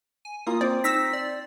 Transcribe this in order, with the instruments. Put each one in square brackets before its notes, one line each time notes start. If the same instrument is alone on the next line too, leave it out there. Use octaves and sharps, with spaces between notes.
[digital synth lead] G#5
[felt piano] A#3 F4 [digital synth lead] D#6
[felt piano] C4 [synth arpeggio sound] D5
[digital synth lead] D#4 [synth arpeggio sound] E6 A#6 B6
[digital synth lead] D5